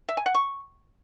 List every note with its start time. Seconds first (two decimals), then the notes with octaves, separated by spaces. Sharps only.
0.09 E5
0.17 G#5
0.26 F#5
0.35 C#6